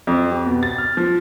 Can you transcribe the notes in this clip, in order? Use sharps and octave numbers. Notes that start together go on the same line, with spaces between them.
F2
G4
B2
A6
F6
F3